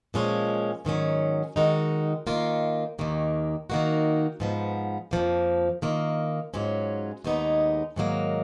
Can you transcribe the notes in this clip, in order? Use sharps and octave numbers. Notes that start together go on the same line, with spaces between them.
A#2 F3 G#3 C#4
G#2 D#3 F#3 C#4
D#3 G#3 D#4 F#4
D#3 A#3 F4
D#2 D#3 A#3
D#3 A#3 D#4 F#4
G#2 F3 B3
F2 F3 A#3
D#3 A#3 F4
G#2 F#3 C#4 F4
D#2 C#3 G#3 B3 D#4
G#2 D#3 F#3 A#3